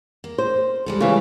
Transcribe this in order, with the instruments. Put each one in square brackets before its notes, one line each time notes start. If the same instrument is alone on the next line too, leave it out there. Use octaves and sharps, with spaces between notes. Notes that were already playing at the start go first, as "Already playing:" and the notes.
[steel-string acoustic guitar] A#3
[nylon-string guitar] C5
[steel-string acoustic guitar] G3 G#3 A4
[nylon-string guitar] C#3 E3